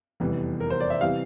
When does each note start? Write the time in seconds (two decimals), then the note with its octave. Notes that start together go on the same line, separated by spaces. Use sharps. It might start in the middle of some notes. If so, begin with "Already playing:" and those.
0.20 F1 E2 E3 G3
0.60 A#4
0.70 C5
0.80 D5
0.90 E5
1.01 C3 E3 G3 F5